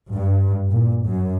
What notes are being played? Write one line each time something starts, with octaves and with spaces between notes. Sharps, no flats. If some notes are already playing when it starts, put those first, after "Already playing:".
G2
A#2
F#2